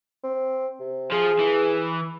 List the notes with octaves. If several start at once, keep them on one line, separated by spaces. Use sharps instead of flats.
C4
C3
F3 G#4
E3